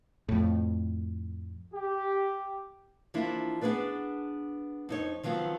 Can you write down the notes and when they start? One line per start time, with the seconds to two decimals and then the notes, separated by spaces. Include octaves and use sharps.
0.29 F2 A2
1.74 G4
3.14 E3 F3 A#3 D4 E4
3.61 B3 D4 G#4 B4 D5
4.89 F2 D#4 C#5
5.23 D#3 F3 F#3 B3 C4